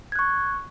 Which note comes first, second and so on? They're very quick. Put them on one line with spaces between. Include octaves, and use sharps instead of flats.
G#6 F#6 C#6